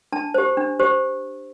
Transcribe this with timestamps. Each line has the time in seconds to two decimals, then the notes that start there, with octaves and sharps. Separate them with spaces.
0.12 D4 A5
0.34 G4 C5
0.57 D4
0.79 G4 C5